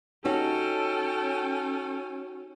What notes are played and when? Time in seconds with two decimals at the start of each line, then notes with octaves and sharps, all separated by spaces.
0.25 C#4 D#4 F#4 G4 A4 C#5 G5